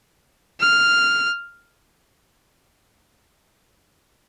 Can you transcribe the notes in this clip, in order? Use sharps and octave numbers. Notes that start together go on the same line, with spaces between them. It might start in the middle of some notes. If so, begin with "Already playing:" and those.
F6